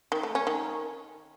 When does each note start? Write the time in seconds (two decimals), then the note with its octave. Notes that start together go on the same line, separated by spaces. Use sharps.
0.12 D#3
0.23 A3
0.35 C#4
0.47 D#3